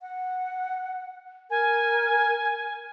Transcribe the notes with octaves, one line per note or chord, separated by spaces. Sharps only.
F#5
A#4 G#5